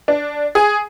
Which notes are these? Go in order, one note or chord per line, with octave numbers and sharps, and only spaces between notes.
D4
G#4